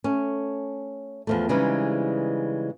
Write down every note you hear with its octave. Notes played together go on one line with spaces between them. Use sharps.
A3 C#4
E2 F3 A3
C#3 E3 G3 G#3 C4 D#4